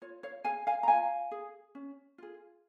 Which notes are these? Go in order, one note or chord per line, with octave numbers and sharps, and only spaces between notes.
F4 C#5
C#5 F5
G#4 F5 G#5
F5 G#5
A#5
F4 F5 G#5
G#4
C#4
F4 G#4